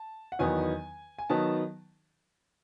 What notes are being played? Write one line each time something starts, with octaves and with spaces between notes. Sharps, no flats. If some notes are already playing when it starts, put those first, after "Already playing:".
Already playing: A5
F#5
E2 D#3 F#3 B3 D#4 G#5
G#5
D#3 F#3 B3 D#4 A5